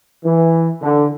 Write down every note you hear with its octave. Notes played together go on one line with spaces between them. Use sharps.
E3
D3